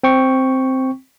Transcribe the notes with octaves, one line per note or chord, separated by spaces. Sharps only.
C4 G5 C#6